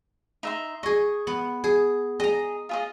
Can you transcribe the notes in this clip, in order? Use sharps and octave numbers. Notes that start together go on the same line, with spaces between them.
D#4 E5 C6
G#4 D#5 C#6
B3
G#4
G#4 D#5 A#5
F4 G#4 D#5